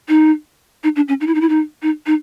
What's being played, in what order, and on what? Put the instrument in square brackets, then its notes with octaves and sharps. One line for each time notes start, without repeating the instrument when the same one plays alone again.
[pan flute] D#4
D#4
D4
C#4
D#4
E4
D#4
E4
D#4
D#4
D#4